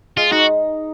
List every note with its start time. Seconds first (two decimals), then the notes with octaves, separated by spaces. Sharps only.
0.17 G#3 F4
0.31 D#4 F#4